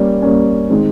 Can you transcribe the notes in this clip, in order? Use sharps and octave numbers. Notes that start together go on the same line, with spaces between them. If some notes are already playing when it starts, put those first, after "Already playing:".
Already playing: G3 A#3 C#4
G3 A#3 C#4
D#3 G#3 C4